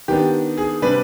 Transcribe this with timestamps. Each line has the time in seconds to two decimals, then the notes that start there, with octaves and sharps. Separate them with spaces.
0.08 D#3 B3 D4 G4
0.58 G#4
0.82 C3 G3 D4 B4